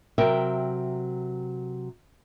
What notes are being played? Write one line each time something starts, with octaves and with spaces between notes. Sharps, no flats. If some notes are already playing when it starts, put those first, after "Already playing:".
C3 F#3 A#4 E5 G5